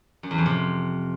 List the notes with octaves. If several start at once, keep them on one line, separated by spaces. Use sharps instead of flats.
F#2
E2
F2
C3